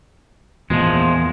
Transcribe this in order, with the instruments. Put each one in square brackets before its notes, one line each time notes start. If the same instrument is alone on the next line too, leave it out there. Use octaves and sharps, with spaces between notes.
[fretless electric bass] E2 A#2 [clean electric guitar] F3 G#3